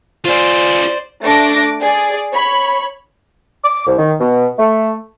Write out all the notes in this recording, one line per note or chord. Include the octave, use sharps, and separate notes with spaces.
F4 G#4 C5 D5
A3 D4 D6 A#6
G#4 D5
C#5 B5
D6
C2
D#3
B2
A3